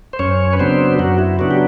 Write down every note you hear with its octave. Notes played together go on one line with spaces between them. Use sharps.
C5
F#2 C#4 C#5
B4
C#3 F#3 B3 C4 D4 C5
F#2 F#3 F#4
E4
C#3 F#3 B3 D4 F#4
G4